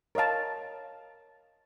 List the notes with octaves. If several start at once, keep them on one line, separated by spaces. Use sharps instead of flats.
A#4 C#5 D#5 F5 A5